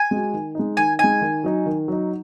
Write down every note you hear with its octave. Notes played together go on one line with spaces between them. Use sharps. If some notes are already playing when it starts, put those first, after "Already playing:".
Already playing: G#5
G#3 F#4
D#3
G#3 D#4
D#3 G#5
G#3 D#4 G#5
D#3
F#3 D#4
D#3
F#3 D#4